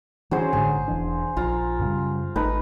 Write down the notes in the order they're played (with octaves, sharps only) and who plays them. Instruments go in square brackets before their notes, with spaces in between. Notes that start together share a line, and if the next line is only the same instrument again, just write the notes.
[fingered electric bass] E3 C#4 [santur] F#3 G#4 C5
[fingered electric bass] A1 G#2 D3 [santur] G#4
[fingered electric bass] E1 E3 D4
[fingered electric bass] A#1 [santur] F4 A#5
[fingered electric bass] F#2 C#3 G3
[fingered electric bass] G#1 A3 [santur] D#4 B4 A5